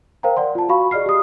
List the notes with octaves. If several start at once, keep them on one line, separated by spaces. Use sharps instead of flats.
A#4 C5 F5 G5 A#5
D5 F#5 C6
F4 A5
F#4 F5 B5 C#6
G#4 D5 D#5 F6 C7
G4 D#6